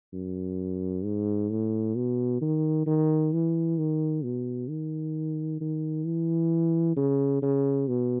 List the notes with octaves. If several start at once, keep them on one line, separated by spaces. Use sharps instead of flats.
F#2
G#2
A2
B2
D#3
D#3
E3
D#3
B2
D#3
D#3
E3
C#3
C#3
B2